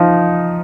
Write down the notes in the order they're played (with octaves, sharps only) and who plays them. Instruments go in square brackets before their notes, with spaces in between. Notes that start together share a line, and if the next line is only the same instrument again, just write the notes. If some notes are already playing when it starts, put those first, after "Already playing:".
Already playing: [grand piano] F3 D#4